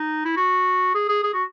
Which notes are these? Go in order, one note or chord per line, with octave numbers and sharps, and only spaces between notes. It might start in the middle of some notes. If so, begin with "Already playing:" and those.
Already playing: D#4
E4
F#4
G#4
G#4
G#4
F#4